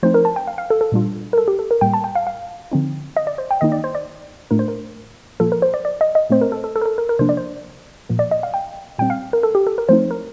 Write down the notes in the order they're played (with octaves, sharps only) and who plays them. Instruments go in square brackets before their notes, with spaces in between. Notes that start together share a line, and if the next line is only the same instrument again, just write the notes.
[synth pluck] F3 A3 C4 D#4 C5
A#4
A5
G5
F5
F5
A4
A4
A#2 G3 D4 F4
A#4
A4
G4
A4
A#4
A2 G3 A#3 G5
A5
G5
F5
F5
D3 F3 C4 D#4
D#5
D5
C5
G5
D#3 A#3 D#4 D#5
D5
C5
D5
A2 A3 D4 F4 A#4
C5
A#4
A#2 F3 A#3 F4 A4
A#4
C5
D5
D5
D#5
D#5
A#2 A3 C4 C5
A#4
A4
A4
A4
A#4
A4
A#4
A#4
C3 F3 A#3 D4 C5
D5
C5
A#2 F3 A#3
D5
D#5
F5
G5
A#2 G3 C4 G5
F5
A#4
A4
G4
A4
A#4
F3 A3 C4 D#4 C5
A#4